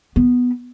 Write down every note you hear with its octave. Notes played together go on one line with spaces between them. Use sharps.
B3